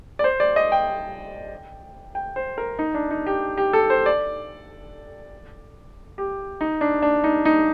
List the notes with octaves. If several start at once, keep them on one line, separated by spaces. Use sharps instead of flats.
D5
C5
D5
D#5
G5
G5
C5
A#4
D#4
D4
D#4
G4
G4
A4
C5
D5
G4
D#4
D4
D4
D#4
D#4